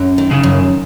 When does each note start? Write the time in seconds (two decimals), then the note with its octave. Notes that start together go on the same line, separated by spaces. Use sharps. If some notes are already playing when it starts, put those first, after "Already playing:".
Already playing: F#2
0.18 D#3
0.31 C#3
0.43 F#2